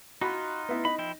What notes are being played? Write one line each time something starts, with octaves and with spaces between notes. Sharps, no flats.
D#4 F4 F#4 B5
B3 E4
D#4 B5
F3 E4 G5